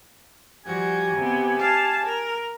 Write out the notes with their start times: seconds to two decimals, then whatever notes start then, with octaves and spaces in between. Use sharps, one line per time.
0.66 F3 G3 F#4 G4 G#5
1.16 C3 B3
1.57 F5 A5
2.04 A#4